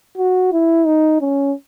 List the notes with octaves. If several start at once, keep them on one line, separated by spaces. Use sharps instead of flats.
F#4
E4
D#4
C#4